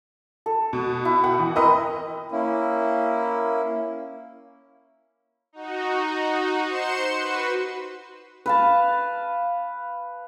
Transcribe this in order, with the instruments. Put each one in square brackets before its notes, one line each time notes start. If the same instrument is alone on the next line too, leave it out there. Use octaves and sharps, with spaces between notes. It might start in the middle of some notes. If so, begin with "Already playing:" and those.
[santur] A4
[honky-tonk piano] B2
[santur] E4
[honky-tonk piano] F#5 [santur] G5 D#6
[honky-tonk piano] E3
[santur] C4 E4 A#4 [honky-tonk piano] B4 D#5 D#6
[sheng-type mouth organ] A#3 C#4 E4
[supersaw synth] D#4 F#4
C5 C6 C#7 E7
F#4 B4
[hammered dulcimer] B4 F5 A5